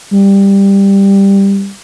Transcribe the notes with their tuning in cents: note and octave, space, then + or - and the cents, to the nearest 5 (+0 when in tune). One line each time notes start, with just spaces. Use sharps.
G3 +10